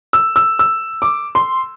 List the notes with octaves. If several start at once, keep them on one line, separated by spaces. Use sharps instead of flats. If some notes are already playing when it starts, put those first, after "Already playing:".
E6
E6
E6
D6
C6